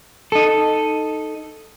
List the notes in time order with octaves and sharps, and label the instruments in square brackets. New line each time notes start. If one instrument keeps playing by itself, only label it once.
[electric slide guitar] D#4 A4